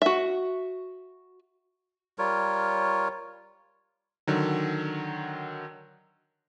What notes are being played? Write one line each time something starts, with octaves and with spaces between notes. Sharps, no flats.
F#4 E5
G3 F4 A#4 C#5
D3 D#3 F#3